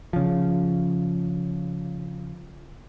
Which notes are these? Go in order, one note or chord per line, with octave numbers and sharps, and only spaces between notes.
C#3 F3